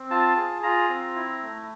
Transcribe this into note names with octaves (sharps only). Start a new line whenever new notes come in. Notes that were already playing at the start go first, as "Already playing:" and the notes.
Already playing: C4
F4 A5
G#4
F4 A#5
C4
E4
A3